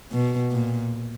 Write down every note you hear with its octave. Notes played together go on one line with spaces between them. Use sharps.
B2
A#2